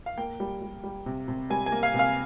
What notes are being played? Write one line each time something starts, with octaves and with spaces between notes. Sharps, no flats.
F5
A#3 G5
G3
G3
G3
C3
C3
G3 G#5
G#5
A#3
F5
C3
F5